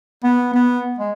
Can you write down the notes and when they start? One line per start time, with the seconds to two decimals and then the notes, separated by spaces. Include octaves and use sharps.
0.24 B3
0.54 B3
0.99 G#3